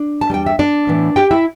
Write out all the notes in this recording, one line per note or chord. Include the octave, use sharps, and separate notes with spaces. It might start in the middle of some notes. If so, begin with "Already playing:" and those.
Already playing: D4
A5
E2 E3 G3 G5
E5
D4 D5
A2 E3 B3
G4 G5
E4 E5